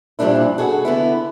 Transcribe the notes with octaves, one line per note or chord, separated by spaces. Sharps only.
G2 A#2 F3 G3 D4 E4
F#4 G#4 A4 F#5
D3 B3 E4